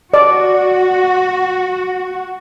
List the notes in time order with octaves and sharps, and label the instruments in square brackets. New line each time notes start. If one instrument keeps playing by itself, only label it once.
[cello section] F#4 [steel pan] D5